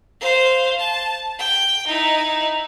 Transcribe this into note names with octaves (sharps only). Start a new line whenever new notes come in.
C5 F5
A5
G5
D#4 E4